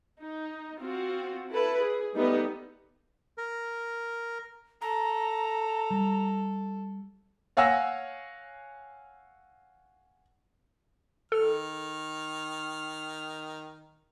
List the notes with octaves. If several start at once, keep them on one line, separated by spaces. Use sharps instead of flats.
D#4
C4 F4 F#4
E4 A4 B4
G#4
G3 A3 B3 D#4 B4
A#4
A4 A#5
G3
C#5 F5 F#5 G#5 E6 A#6
D#3 A4 F6